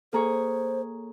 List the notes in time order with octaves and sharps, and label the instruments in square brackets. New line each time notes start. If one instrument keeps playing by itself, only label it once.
[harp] A#3 G#4 C#5 [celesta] A4 A#5 [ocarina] C5